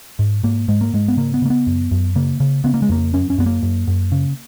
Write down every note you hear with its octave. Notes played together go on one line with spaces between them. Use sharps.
G#2
G#2 A#3
G#2 G#3
A#3
G#2 G#3
B3
C#3 A#3
B3
C#3 A#3
B3
F#2
F#2
C#3 A#3
C#3
C#3 B3
A#3
G#3
F2 A#3
F#2 C#4
C#4
F#2 B3
A#3
F#2
F#2
C#3